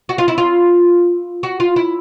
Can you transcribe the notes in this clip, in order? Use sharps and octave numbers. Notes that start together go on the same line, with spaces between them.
F#4
F4
E4
F4
F#4
F4
E4